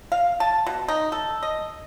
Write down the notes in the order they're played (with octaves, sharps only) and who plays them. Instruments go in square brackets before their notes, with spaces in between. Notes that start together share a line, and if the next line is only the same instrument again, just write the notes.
[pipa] F5
A5
B2
D#4
A4
D#5